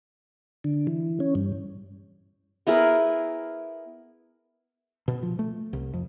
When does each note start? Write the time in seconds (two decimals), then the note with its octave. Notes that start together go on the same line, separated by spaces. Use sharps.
0.64 D3
0.87 E3
1.20 C#4
1.35 G2
2.67 B3 E4 G#4 A#4
5.08 B2
5.23 F3
5.39 A3
5.73 C2
5.94 F2